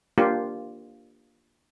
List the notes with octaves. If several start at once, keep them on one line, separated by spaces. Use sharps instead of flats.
A#3 D4 F4 G4